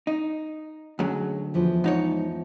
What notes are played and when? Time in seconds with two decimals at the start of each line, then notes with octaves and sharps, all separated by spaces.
0.07 D#4
0.99 D2 F#3 G#3 C#4
1.54 E2 F3 E4
1.84 G#2 D#4 C#5